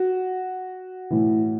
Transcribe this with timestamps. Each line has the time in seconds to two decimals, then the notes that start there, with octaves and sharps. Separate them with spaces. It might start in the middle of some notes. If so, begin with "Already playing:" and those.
Already playing: F#4
1.10 A2 E3